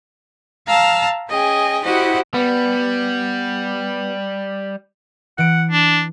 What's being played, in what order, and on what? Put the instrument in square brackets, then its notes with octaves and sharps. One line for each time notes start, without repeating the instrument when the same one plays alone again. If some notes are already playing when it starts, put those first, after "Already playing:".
[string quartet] F5 A5 A#5 E6 F6
C#4 G#4 D#5 G5 G#5
E4 F#4 G4 C5 D#5 F#5
[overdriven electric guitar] G3 [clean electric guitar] B3
[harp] E3 D7 [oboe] F#5
[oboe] D4